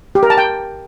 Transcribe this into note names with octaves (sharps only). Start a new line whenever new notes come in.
G4
A#4
A5
G5